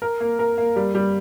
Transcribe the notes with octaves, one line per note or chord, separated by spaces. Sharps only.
A#4
A#3
A#4
A#3
G3
G3